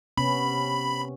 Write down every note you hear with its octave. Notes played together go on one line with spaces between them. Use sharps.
C3 B3 C#4 B5